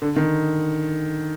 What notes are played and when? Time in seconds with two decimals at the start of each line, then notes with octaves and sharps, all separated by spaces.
0.02 D3
0.16 D#3